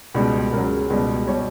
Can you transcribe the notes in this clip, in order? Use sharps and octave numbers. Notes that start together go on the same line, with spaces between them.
C#2 B2 G3
C#2 C#3 F#3 A#4
C#2 B2 G3
B2 G3 C#5